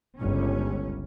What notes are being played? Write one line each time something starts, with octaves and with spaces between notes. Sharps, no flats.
G1 C#2 C#4